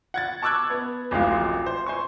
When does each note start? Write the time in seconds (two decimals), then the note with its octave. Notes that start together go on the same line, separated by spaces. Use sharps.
0.14 F#5 G#6 A6
0.42 A5 C#6 D6 E6 F#6 G#6
0.70 B3
1.11 D1 A1 F3 G#3 F5
1.66 C5
1.86 C5 G#5 C#6